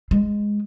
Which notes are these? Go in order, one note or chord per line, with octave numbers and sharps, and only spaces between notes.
G#3